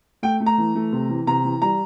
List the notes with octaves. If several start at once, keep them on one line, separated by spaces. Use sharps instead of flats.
A3 G5
A3
A#5
E3
A3
C3
E3
C3 A#5
E3
G3 A#5